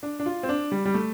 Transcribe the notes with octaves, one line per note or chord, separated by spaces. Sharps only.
D4
D4
F4
C4
D4
G3
G3
A3